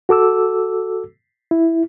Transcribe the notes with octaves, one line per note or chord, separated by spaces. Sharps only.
F#4 A4 D6 E6
E4